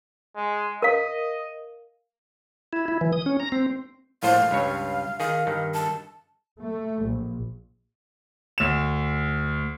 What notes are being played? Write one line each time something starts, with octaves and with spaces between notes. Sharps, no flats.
G#3
A#4 D#5 F5
E4
E4
E3
D#6
C#4
A#5
C4
A#1 A2 C5 F5
C#2 G2 C#5
D#3 G#4 F5
G2 D#3
A5
A3
A#1
D2 E7